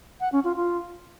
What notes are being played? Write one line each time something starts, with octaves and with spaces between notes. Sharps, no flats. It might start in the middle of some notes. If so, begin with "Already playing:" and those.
F#5
C#4
F4
F4